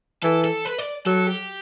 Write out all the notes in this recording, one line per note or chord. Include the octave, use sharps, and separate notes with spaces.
E3 A4
A4
B4
D5
F#3 A4
G4